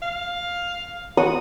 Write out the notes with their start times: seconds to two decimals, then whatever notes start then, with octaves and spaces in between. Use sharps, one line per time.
0.02 F5
1.17 F#4 D#6